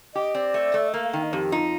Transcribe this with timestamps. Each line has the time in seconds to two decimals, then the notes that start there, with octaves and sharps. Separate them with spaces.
0.14 G4 D#5
0.35 C4 D5
0.54 A3
0.74 A3
0.88 D#5
0.94 A#3 F5
1.04 F5
1.13 D#3 G5
1.23 D#5
1.33 F2 G4
1.52 D#4 F4